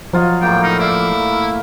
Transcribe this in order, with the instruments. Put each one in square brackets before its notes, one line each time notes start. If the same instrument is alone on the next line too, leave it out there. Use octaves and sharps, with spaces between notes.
[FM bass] F3 [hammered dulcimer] F#3 F4 D#5
[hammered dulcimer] A2 A#3 [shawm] G5
[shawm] D#4 [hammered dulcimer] F5
[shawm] E4 [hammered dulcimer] D5 E5 F5